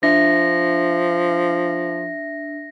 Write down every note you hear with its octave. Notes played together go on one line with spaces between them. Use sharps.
F3 D4 E5 A#6